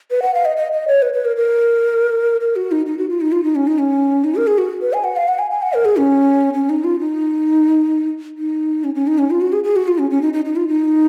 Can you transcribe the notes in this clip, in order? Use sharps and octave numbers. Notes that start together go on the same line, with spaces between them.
B4
F#5
F5
D#5
D#5
D#5
C#5
B4
B4
A#4
A#4
A#4
F#4
D#4
D#4
F#4
F4
D#4
F4
D#4
C#4
D#4
C#4
D#4
A#4
G#4
F#4
B4
G#5
F#5
F5
F#5
G#5
G#5
F#5
A#4
G#4
C#4
C#4
D#4
F4
D#4
D#4
C#4
C#4
D#4
C#4
F4
F#4
G#4
G#4
F#4
F4
C#4
C#4
D#4
D#4
D#4
F4
D#4